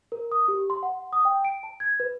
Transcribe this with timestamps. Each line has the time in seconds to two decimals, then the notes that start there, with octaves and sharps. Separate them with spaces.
0.12 A#4
0.32 D#6
0.48 G4
0.70 C6
0.83 F#5
1.13 D#6
1.25 G5
1.45 D7
1.63 A5
1.80 G#6
2.00 B4